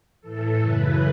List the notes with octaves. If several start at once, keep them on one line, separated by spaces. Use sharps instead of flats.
A2 E3 A4
F#2 C#3 E3 B4